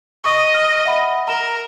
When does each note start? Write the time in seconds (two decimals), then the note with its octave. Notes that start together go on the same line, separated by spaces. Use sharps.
0.24 D#5 C#6 D#6
0.54 F6
0.85 E5 F#5 B5
1.28 A#4 A#5 E7 G7